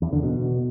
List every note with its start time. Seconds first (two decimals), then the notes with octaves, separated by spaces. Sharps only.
0.02 E2
0.13 D3
0.23 B2